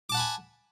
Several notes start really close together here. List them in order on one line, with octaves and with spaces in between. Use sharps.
D6 A5 F#5 B5 G#5